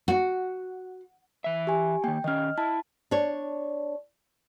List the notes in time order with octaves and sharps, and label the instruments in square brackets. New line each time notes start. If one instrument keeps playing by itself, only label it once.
[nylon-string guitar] F#4
[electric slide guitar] E3 E5
[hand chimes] G4 G#5
[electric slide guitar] D#3 A#3 [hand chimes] G5
[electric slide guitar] D#3 C#4 [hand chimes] D#5 F6
[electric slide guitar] E4 [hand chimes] A5
[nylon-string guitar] D4 C#5